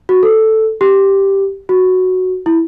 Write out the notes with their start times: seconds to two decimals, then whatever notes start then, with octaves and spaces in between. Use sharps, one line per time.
0.09 F#4
0.23 A4
0.81 G4
1.69 F#4
2.46 E4